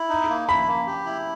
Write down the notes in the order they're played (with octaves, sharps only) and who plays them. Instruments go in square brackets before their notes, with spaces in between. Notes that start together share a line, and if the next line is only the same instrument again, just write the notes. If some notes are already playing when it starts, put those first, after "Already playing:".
Already playing: [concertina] E4
D#4
A#3
[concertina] E4 [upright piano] B5
[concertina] A#3
G4
E4